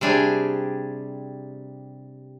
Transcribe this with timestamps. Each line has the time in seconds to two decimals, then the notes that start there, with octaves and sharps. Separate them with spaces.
0.01 C3 G3 D4 G#4 G#5